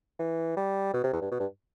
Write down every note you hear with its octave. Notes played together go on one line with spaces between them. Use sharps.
E3
G3
B2
C3
E2
G2
B2
G2